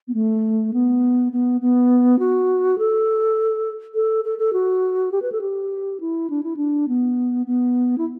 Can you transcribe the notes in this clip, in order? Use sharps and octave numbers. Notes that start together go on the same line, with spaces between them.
B3
A3
B3
B3
B3
F#4
A4
A4
A4
A4
F#4
G4
B4
A4
G4
E4
D4
E4
D4
B3
B3
E4